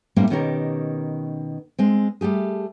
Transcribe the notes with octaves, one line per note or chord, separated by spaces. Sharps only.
A2 G3 A3 A#3 C4 D4
B2 D#3 C#4 G4 A#4
G#3 C4
G3 A3 G4 G#4